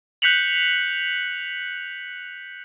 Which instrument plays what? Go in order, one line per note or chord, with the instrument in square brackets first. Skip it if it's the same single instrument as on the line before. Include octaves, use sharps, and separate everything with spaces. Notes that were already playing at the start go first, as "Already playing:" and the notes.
[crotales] F#6 G6 B6 C#7 F7 F#7